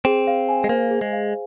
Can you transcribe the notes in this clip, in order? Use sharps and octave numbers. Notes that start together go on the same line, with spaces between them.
C4 G#4
F5
G#5
G#3
A#3 C5
G#4
G#3
F5